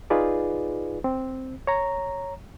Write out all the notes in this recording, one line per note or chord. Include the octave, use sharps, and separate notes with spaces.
D#4 F4 G#4 B4 D5
C4
C#5 A#5